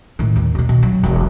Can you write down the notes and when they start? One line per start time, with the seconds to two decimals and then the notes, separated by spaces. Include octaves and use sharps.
0.19 A2 D#3
0.36 D#2
0.55 B2 A#3
0.69 B2
0.83 F#3
1.03 E1 E2